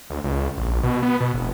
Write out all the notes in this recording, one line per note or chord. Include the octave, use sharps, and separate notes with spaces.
D2
C#2
A#1
B2
B3
B2
F1